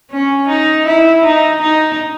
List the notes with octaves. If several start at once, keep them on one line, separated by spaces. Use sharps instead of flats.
C#4
D#4
E4
D#4
D#4